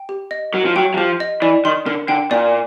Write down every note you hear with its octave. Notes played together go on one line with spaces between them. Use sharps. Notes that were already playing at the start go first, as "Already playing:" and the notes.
Already playing: G5
G4
D#5
F#3 A#4
F3
F#3 G5
F#3
F3 G4
D#5
E3 D5
D#3 C6
D3 A#4
D3 G5
A#2 D5